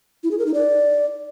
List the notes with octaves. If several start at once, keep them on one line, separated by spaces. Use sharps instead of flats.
E4
G#4
A#4
D#4
D5